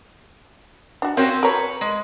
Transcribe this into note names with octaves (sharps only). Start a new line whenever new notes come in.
D4 F#4
C4 C#4 F#4 A#4 C#5 F5
A#4 B4 C#5 A#5
G#3